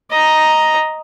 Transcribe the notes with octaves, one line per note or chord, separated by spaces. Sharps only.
D#5 A#5